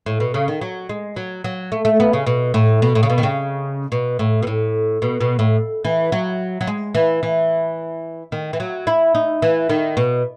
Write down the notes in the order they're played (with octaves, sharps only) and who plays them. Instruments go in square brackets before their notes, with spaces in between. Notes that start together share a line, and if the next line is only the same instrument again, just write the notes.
[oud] A2
B2
C#3
D#3
F#3
G#3
F#3
F#3
A3
A3
B3
C#3
B2
A2
B2
A2
C#3
B2
D#3
C#3
B2
A2
B2
A2
B2
B2
A2
E3
F#3
F#3
G#3
E3
E3
D#3
E3
F#3
E4
D#4
E3
D#3
B2